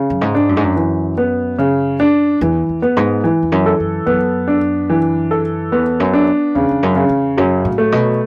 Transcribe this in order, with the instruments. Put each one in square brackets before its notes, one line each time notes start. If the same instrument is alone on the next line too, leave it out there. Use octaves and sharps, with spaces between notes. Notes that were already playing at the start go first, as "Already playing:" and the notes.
Already playing: [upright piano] C#3
[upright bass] F#2
G#2
[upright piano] D4
[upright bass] F#2
G#2
F#2
[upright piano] E3
B3
C#3
D4
[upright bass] E2 [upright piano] E3
[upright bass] E2
[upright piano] B3
[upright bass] G#2
[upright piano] E3
[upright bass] E2
F#2
[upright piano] A4
[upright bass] F#2
[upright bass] F#2 [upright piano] B3
[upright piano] D4
E3
A4
[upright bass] E2 [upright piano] B3
[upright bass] F#2
[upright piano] D4
[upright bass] E2 [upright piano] C#3
[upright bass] E2
F#2
[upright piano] C#3
[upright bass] E2
[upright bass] F#2 [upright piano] F#3
[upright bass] A2
[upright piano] A3
[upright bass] B2